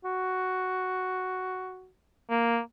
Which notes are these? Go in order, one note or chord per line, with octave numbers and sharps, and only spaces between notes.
F#4
A#3